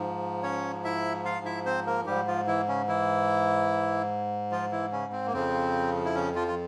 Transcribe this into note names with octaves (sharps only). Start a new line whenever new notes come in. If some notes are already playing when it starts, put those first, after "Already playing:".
Already playing: G#2 F3
C#4 C#5
E4 E5
F4 F5
E4 E5
C4 C5
A#3 A#4
G#2 F3 G3 G4
F3 F4
E3 E4
C#3 C#4
E3 E4
F3 F4
E3 E4
C#3 C#4
C4
A#3
F2 C#3 F3 C4
E4
C#3 C#4
F3 F4
F4